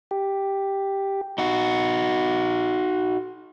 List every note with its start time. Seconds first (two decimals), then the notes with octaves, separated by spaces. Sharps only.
0.11 G4
1.38 D#4 F#4